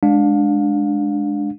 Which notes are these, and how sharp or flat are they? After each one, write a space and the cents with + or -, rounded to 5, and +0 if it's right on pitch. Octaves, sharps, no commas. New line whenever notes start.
G#3 +10 D4 +0 F5 +30